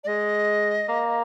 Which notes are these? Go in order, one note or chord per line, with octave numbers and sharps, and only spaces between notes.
D5
G#3 D#5
A#3